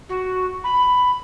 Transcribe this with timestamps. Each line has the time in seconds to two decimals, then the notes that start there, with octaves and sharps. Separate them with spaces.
0.09 F#4
0.64 B5